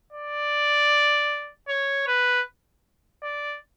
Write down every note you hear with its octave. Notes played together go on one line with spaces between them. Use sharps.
D5
C#5
B4
D5